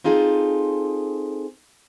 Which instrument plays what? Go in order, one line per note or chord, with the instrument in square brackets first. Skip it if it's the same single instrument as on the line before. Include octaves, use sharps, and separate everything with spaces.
[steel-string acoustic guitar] C4 D#4 F4 G#4 A4